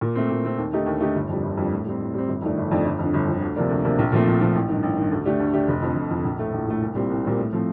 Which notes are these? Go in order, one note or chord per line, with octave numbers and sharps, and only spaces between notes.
A#2
A3 C4
A#2
A3 C4
D#2
D3 A3 D#4 G4
D#2
D3 A3 D#4 G4
G1
F2 D3 G3
G1
F2 D3 G3
A2
G3 C4
A2
G3 C4
G1
F2 D#3 A3 D4
G1
F2 D#3 A3 D4
G1
F2 D3
G1
F2 D3
D2
C3 F3 A#3 D4
D2
C3 F3 A#3 D4
A#1
A#2 F3 A3 C4
A#1
A#2 F3 A3 C4
A1
G2 D#3
A1
G2 D#3
D2
D3 A3 D4 G4
D2
D3 A3 D4 G4
F1
F2 D3
F1
F2 D3
A#1
A2 A3
A#1
A2 A3
C2
A#2 G3 C4
C2
A#2 G3 C4
A2
F3 A3 C4